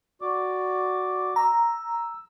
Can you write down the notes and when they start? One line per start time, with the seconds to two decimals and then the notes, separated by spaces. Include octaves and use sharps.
0.22 F#4 D5 D6
1.36 A#5 E6